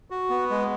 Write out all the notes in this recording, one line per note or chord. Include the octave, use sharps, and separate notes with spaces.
F#4
B3
G#3